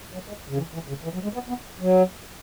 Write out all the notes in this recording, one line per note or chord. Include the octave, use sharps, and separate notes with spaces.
F#3
G#3
C#3
E3
E3
C#3
E3
F#3
G#3
B3
B3
F#3